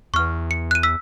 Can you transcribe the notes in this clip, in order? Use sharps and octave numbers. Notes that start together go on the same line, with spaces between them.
E2 C#6 F6
C#7
F#6 D#7
E6 B6